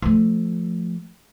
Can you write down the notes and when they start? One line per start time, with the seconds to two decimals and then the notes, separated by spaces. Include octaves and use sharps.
0.02 F3 A3